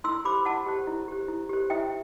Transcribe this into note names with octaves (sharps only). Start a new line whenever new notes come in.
E4 C6 E6
G4 C5 B5 D6
E4 F#5 A5
G4 C5
E4
G4 C5
E4
G4 C5
E4 E5 G5